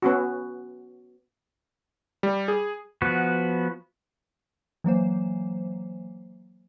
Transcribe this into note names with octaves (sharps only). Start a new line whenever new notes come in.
B3 C#4 F#4
G3
G#4
F3 B3 F#4
E3 F#3 A#3 C5